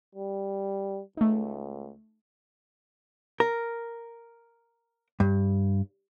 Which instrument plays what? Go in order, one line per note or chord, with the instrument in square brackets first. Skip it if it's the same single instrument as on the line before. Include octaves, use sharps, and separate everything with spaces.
[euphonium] G3
[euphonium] C#2 [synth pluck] A3 D#4
[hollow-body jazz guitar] A#4
G2